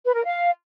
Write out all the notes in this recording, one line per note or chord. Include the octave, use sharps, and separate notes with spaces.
B4
A#4
F5